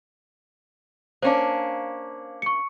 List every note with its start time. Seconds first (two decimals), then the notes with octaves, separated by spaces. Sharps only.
1.22 A#3 C#4 D4 C5 F5
2.42 C#6 C#7